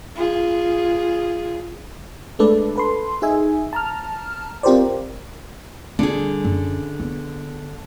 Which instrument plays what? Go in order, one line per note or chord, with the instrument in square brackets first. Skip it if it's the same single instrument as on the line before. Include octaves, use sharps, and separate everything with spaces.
[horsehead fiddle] F4 G#4
[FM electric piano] G#3 A3 D4 A4 B4 D5
A4 B4 C6
D#4 G#4 E5 G#5
A5 A#5 F6
C4 F4 G4 A#4 C5 D5
[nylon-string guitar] D3 G#4 [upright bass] G3
[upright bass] F#2
B3